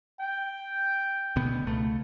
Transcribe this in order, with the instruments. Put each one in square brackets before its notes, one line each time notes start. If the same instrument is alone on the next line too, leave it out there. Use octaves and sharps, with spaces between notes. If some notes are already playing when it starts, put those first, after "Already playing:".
[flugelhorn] G5
[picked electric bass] D2 B2 B3
C#2 A3